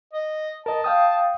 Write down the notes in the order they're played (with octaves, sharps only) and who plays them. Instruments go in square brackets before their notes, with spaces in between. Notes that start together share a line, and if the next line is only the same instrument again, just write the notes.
[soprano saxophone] D#5
[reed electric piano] A#4 D#5 [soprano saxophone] A5
[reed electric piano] F5 G5 D#6